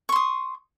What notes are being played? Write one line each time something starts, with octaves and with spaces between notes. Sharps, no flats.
C6 C#6 D#6